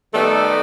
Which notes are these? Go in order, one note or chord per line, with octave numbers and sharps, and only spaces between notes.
D#3 G3 A3 B3 D#4 A4